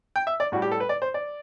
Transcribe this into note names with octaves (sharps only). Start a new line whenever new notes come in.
G5
E5
D5
A2 G3 F#4
G4
A4
B4
D5
C5
D5